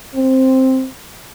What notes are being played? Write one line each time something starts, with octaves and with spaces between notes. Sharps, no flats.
C4